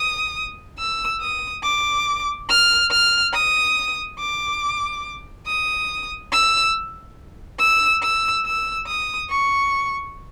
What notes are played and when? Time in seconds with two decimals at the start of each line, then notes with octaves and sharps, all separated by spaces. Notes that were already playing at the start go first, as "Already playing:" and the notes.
Already playing: D#6
0.78 E6
1.20 D#6
1.63 D6
2.49 F6
2.91 F6
3.33 D#6
4.19 D6
5.47 D#6
6.32 E6
7.59 E6
8.02 E6
8.45 E6
8.87 D#6
9.30 C#6